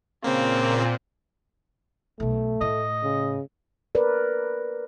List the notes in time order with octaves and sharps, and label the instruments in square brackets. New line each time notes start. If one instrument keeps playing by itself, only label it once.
[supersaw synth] A#2 [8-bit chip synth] C#3 A#3 [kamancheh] C4
[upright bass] B1 B2 [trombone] A3
[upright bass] A2 [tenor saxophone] D#5
[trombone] C#3
[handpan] A#4 B4 D5